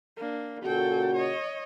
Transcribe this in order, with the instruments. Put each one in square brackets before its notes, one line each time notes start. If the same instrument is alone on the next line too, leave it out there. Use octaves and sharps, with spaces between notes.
[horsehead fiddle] A#3 D4
[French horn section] A#2 C#3 F#4 [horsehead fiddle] A4 G5
[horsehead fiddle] C#5 D#5